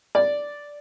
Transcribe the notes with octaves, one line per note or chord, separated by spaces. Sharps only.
D5